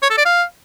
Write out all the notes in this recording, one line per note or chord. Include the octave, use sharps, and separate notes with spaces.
C#5
A4
D5
F5